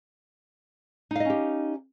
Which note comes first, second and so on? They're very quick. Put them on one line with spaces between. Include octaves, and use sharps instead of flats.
D#4 F5 D#5 C#4 G4